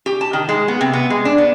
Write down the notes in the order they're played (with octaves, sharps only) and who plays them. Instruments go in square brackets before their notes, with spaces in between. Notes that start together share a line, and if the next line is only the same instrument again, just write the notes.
[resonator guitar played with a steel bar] G4
A5
D#3
G#3
B3
C3
B3
G#3
D4
B3